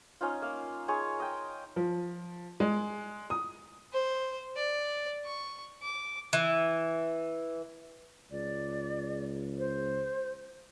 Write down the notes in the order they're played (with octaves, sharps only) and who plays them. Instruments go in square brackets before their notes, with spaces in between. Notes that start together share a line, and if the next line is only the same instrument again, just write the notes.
[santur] C#4 D#4 F4
A#3 F5
D#4 G#4 C#5 C6
D#5 G5
[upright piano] F3
G#3
D#6
[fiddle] C5
D5
C#6
D6
[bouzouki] E3
[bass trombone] C#2 [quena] D5
[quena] C5